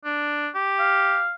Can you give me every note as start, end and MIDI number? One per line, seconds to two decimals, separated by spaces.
0.05 0.49 62
0.55 1.22 67
0.79 1.33 77